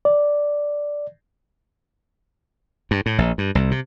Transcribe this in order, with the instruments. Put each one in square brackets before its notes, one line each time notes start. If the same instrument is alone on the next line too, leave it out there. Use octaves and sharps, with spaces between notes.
[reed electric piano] D5
[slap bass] G2
A2
A#1
G2
C2
C3